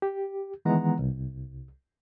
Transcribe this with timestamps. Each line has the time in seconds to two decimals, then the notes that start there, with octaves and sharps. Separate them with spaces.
0.02 G4
0.65 D#3 E3 G#3 B3 F#5 A#5
0.99 C2